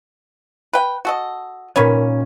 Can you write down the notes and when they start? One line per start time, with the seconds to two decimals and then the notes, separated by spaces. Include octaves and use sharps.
0.73 B4 G5
1.05 F#4 A4 D#5
1.76 A#2 D#3 C#4 B4 C#5